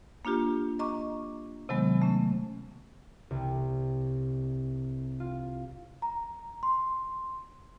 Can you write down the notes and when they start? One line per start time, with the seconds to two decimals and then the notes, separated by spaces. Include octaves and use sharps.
0.25 A#3 D4 F4 G4
0.79 D#5 A#5 C#6 D6
1.69 C3 D#3 F#3 G#3 B3
2.02 A3 C#4
3.30 C2
5.20 F4
6.02 A#5
6.63 C6